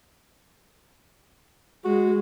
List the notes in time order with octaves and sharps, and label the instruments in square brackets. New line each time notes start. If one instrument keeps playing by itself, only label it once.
[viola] G#3 [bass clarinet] F#4